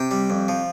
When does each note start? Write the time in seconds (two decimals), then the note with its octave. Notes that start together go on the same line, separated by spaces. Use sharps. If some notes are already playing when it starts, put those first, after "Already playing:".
Already playing: C3 G5
0.11 G3
0.30 F2
0.48 F3